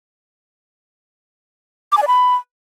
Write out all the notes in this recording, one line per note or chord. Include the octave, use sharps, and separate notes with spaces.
D6
G#5
D5
B5